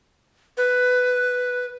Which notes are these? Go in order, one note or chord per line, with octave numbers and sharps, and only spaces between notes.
B4